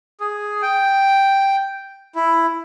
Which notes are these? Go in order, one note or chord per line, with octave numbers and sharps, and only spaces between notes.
G#4
G5
E4